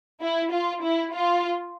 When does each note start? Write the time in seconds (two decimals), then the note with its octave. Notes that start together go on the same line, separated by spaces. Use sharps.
0.21 E4
0.52 F4
0.82 E4
1.13 F4